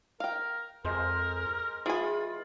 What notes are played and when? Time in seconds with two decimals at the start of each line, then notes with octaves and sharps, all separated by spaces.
0.20 A#4 F5 G5
0.85 F2 G#3 A#4 C5
1.86 E3 F4 G#4 G#5 B5